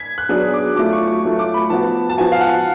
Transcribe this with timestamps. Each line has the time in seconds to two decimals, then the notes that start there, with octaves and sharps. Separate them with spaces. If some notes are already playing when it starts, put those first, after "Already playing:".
Already playing: G#6 B6
0.18 F#6
0.29 F#3 B3 D4 G#4 F#6
0.53 D6
0.76 F#3 A3 F4 D6
0.93 C#6
1.08 C#6
1.23 F#3 A3 F4
1.39 D6
1.54 B5
1.70 F3 B3 F#4 A5
2.09 A5
2.18 F3 B3 F#4 G#5
2.32 F5
2.41 F#5